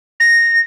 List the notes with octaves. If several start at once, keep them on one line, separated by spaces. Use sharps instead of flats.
A#6